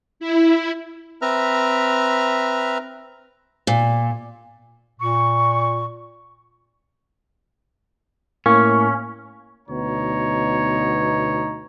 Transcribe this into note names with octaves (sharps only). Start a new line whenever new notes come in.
E4
C4 B4 E5 A#5 F6
A#2
A#2 C#6
A2 A#3 C#4 C#6
D2 B2 B3 D#4 C#5 A#5